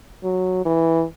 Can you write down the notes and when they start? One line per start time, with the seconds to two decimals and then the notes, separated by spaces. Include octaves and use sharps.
0.23 F#3
0.65 E3